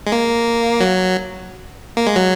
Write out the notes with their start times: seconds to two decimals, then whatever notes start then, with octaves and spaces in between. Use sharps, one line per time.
0.07 G#3
0.12 A#3
0.80 F#3
1.97 A#3
2.07 G#3
2.16 F#3